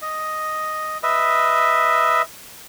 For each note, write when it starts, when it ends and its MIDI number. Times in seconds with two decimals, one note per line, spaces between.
0.02 0.98 75
1.03 2.22 71
1.03 2.22 75
1.03 2.22 76